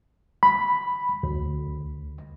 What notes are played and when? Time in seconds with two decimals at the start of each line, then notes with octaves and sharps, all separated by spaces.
0.43 B5
1.23 D2